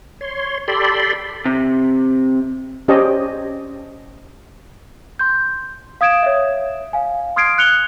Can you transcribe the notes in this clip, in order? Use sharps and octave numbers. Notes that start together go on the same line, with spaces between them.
C#5 C6
G4 A4 D5 B5 C6
C3
C#4 G4 C5 C#5 D#5 A5
C6 G6
F5 D#6 G#6 D7 E7
C#5 E5
F5 G#5
C6 D#6 F6 G#6 C7 D7
F#6 C#7 F7 G7